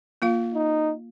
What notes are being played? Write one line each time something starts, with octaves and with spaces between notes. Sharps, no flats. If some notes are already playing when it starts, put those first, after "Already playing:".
A#3 F4 F5
D#4